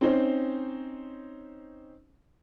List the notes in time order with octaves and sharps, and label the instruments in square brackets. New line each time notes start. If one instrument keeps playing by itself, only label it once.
[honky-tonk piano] C4 C#4 D#4 C5